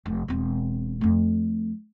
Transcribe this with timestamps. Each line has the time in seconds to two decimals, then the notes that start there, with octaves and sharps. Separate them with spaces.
0.06 F1
0.28 E1 C4
1.01 F2 A3